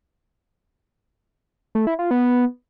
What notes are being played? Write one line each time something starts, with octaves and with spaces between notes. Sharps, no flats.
A3
E4
F4
B3